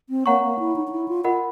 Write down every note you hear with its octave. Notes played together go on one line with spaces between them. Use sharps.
C4
A#3 C#5 F#5 A#5 C#6
A#3
E4
D#4
D#4
E4
F4
F4 A#4 D#5 F#5 B5